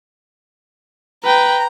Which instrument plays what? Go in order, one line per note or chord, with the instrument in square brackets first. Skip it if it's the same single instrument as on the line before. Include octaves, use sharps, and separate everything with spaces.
[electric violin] B4 G5 [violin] A#5